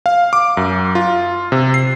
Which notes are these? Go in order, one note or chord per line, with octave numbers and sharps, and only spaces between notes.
F5
D6
F#2
F4
C3
C7